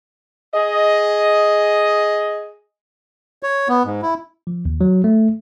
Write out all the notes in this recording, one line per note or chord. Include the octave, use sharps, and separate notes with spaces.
G#4 D#5
C#5
B3
G#2
E4
F3
D#2
F#3
A3